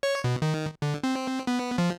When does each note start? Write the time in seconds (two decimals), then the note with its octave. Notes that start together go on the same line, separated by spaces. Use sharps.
0.03 C#5
0.24 B2
0.42 D#3
0.82 D3
1.03 C4
1.47 B3
1.78 F3